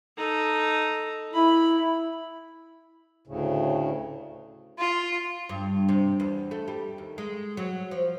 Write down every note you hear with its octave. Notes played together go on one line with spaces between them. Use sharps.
D#4 A4
E4 B5
D2 A2 C#3
F4
G2
C3
E2
A3
G3
D#2
G#3
F#3
F3